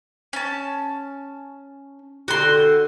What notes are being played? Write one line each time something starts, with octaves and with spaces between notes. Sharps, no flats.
C#4 A5
D3 F#4 G4 C6